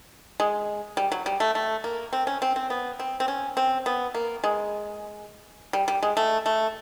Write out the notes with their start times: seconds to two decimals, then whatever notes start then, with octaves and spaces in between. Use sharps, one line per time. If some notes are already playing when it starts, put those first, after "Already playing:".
0.40 G#3
0.97 G3
1.12 F#3
1.26 G3
1.40 A3
1.55 A3
1.84 A#3
2.13 C4
2.27 C#4
2.42 C4
2.56 C4
2.70 B3
2.99 C4
3.20 C4
3.28 C#4
3.57 C4
3.86 B3
4.14 A#3
4.44 G#3
5.73 G3
5.88 G3
6.03 G#3
6.17 A3
6.46 A3